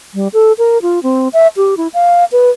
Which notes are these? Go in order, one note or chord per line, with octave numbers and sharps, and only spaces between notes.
G3
A4
A#4
F4
C4
E5
G4
E4
F5
B4